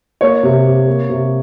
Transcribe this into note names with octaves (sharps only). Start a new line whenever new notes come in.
A#3 C#5
C3
C3
A#3
C3